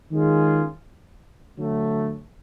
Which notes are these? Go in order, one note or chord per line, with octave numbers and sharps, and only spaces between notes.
D#3 G#3 C#4 F4 G#4
D3 F#3 A3